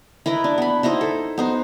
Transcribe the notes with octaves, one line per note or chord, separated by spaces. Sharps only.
E4 A#4 B4 D#5
D4
B3 B5
D#4 E4 C5 D#5
A4
B3 D#4 C5